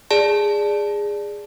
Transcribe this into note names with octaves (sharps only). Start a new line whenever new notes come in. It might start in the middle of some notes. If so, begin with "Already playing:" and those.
G#4 D5 A5